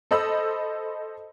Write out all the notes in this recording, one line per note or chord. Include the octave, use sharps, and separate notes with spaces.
A4 C5 D#5 B5 E6